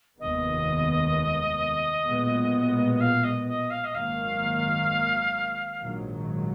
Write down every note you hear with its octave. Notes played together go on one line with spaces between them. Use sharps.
F1 D#2 D#3 G#3 B3 D#5
B1 A#2 G#3 B3
D#5
F5
D#5
D#5
F5
D#5
G#1 F#2 D#3 A#3 F5
A#1 G#2 D#3 F#3